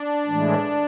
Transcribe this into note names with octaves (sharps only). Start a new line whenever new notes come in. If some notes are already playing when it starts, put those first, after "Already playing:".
Already playing: D4
A2 E3 G#3